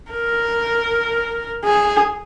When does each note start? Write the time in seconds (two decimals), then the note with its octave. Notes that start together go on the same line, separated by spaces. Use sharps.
0.11 A#4
1.65 G#4